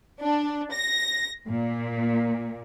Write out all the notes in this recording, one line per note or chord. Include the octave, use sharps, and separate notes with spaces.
D4
A#6
A#2